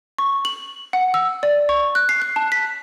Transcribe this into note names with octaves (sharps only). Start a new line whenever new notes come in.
C#6
F#7
F#5
E6
D5
C#6
F#6
C7
F#6
A5
B6